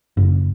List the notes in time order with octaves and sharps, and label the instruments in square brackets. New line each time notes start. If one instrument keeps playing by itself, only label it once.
[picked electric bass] F#1